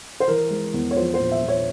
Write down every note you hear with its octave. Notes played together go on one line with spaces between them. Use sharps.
C5
E3 A#4
G#3
E2
C#5
F3 C5
C5
A#1
E5
A#2
C#5